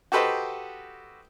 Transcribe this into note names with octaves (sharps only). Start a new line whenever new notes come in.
F#4 G4 A4 B4 C5 D#5